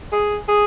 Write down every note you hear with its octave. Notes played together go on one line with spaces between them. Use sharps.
G#4
G#4